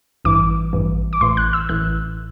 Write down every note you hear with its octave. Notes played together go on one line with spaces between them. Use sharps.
A1 G2 E3 D6
A1 G2 E3
D6
A1 A2 E3 C6
F#6
E6
A1 A2 E3 F#6